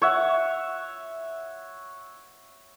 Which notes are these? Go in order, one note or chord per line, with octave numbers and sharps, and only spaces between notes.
C#5 E5 F#5